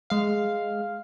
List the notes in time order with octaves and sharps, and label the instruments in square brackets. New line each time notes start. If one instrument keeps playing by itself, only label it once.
[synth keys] G#3 F5